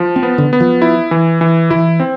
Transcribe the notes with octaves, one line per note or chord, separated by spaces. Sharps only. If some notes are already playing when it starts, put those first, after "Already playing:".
Already playing: F3
C4
B3
D3
B3
F3
E4
E3
E3
E3 E4
C4